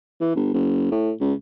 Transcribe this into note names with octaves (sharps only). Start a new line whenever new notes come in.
E3
G1
F#1
A2
C#2